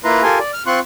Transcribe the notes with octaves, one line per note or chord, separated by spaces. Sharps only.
A#3 E4 F4 B4 A#5 C6
F4 G4 A4 A#4 G#5 C6
D5
F6
C4 F4 C6 C#6 F#6